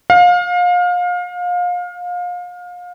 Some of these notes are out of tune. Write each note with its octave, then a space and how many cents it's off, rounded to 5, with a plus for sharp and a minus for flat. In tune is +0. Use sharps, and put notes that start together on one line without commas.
F5 +30